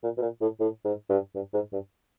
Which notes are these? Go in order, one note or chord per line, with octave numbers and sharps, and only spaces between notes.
A#2
B2
A#2
A2
A2
G#2
G2
G2
G#2
G2